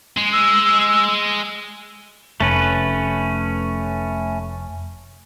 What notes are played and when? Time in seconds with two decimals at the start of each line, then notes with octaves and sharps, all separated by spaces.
0.17 G#3
0.33 E6
2.40 F1 A3 C#4 B4